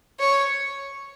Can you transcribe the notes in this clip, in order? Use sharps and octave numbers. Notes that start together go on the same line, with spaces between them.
C#5